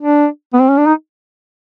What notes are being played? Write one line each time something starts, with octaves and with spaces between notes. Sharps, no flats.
D4
B3
C4
C#4
D4
D#4